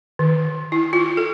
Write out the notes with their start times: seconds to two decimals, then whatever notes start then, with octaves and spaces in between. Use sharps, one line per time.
0.19 D#3
0.72 E4
0.93 F4
1.17 A4